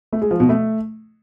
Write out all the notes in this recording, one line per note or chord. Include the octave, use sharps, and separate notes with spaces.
A3
G#3
F3
B2
A3